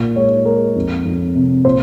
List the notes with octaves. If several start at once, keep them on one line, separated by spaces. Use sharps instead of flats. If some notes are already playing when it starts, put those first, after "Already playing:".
Already playing: A#2
G#3 C#5
G#3 A#4
F2
F2
C3
A#2 C5